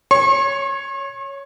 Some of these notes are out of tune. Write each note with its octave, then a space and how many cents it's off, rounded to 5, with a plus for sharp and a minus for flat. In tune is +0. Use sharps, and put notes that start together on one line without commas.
C#5 +0 C#6 -45